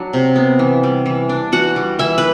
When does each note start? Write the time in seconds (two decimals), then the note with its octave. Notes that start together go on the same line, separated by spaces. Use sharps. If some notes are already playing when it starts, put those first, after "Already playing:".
Already playing: F#3 D4
0.13 C3
0.36 B3
0.59 E3
0.83 G3
1.06 E3
1.29 D4
1.52 E3 F#4 F#5
1.76 G3
1.99 E3 E4 E5
2.18 B4